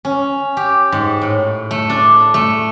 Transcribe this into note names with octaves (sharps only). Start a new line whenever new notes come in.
C#4
G4
G#2
A2
A3
D4
A3